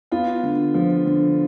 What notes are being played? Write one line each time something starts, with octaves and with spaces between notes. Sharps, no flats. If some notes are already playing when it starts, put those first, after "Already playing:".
B3 F4
D3
F3
D3